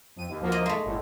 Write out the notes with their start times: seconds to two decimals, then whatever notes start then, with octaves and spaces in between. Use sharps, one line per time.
0.16 F2 D#7
0.29 D#2
0.40 D2 F3 A#3
0.52 D#5
0.66 G#3 A3
0.84 G1 A2